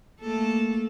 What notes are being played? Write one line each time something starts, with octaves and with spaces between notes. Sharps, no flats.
A3 A#3 A4